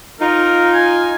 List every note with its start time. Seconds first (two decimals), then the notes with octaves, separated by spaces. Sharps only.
0.20 D#4 F4 A#4
0.74 G#5